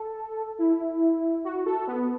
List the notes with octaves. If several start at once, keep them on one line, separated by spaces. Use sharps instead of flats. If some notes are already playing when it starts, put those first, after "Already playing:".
Already playing: A4
E4
F#4
A4
B3